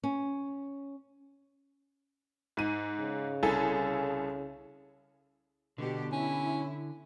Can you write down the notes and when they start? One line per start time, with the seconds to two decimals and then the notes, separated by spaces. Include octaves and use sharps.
0.04 C#4
2.57 G#2 D#7
3.00 C#3
3.43 C2 A4 G#5
5.78 B2 D3 G4
6.12 C#4 E4